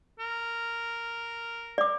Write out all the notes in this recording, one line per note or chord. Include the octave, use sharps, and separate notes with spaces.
A#4
D5 D6